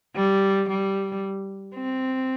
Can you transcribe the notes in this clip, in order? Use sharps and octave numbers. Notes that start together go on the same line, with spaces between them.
G3
G3
C4